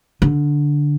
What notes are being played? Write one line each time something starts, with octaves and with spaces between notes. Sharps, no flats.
D3